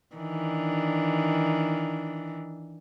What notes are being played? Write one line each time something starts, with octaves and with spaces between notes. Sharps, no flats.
D#3 E3 D4